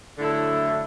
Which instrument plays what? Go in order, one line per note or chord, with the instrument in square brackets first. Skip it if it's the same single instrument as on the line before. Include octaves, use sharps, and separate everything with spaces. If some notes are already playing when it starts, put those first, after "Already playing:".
[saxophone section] D3 F#3 A3 E4 A4